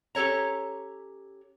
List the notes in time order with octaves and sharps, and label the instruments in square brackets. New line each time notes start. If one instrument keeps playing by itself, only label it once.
[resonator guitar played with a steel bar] C#4 G4 A4 C#5 A#5